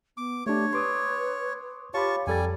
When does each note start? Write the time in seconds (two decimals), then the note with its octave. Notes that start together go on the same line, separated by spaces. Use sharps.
0.17 B3 D6
0.46 A3 D4 G4 C#5
0.73 B4 C6 D6 D#6
1.94 F4 G4 C#5 A5 B5 C#6
2.27 F2 G3 A4 G#5 A6